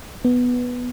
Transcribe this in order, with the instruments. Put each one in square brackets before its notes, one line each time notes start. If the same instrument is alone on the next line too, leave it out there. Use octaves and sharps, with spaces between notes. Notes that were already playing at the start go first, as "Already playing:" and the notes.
[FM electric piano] B3